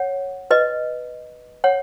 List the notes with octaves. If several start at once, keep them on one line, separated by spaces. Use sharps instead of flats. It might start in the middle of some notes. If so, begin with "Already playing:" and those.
Already playing: C#5 F#5
B4 D#5
C#5 F#5